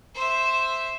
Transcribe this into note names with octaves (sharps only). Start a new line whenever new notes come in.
C5 E5